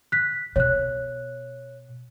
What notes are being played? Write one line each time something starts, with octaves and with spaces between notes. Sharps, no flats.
F#6 B6
B2 C#5 F#6